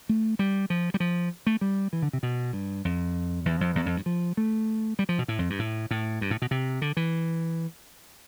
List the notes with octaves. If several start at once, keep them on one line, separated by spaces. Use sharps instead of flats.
A3
G3
F3
G3
F3
A3
G3
E3
D3
C3
B2
G2
F2
E2
F2
E2
F2
G2
F3
A3
G3
F3
B2
A2
F2
G2
A2
A2
G2
A2
B2
C3
D3
E3